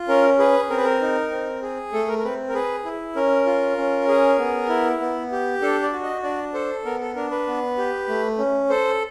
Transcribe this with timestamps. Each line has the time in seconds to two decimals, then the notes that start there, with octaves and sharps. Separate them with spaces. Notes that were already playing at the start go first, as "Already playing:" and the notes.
Already playing: F4
0.08 C#4 A#4
0.39 G#4 B4
0.70 C4 A#4
0.78 B4
0.84 A#4
1.01 D#4
1.31 C4
1.62 G#4
1.92 A3 A4
2.08 A#4
2.19 A#4
2.23 C4 B4
2.49 A#4
2.54 G#4 B4
2.85 E4
3.16 C#4 A#4
3.46 F4
3.78 C#4
4.08 G#4
4.38 B3
4.69 E4
5.00 B3
5.32 G4
5.62 D4 A4
5.83 D5
5.93 F#4
6.03 D#5
6.23 D4 D5
6.54 A4 C5
6.85 B3 A#4
7.01 A4
7.16 D4 A#4
7.31 B4
7.47 B3
7.78 G4
8.09 A3
8.38 C#4
8.69 A4 C5